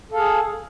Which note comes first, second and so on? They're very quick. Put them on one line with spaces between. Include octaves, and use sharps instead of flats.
A4 F5 G#4